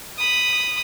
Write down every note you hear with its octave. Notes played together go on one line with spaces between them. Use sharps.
B5 D#6